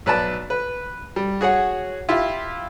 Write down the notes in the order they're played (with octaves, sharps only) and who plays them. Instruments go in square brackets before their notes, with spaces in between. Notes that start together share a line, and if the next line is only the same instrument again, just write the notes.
[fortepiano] B1 B4 D5 A5
B4
G3
F#4 G#4 C#5 F#5
E4 F4 G4